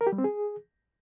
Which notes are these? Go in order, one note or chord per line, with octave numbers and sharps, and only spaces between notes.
A#4
G4
G3
C4
G#4